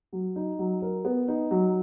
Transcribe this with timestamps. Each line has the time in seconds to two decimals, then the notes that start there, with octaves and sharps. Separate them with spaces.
0.13 F#3
0.36 D#4
0.59 F#3
0.82 A#4
1.05 B3
1.28 D#4
1.51 F#3